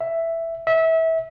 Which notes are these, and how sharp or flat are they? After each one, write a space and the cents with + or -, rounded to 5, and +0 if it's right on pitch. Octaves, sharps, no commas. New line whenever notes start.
E5 +5
E5 -25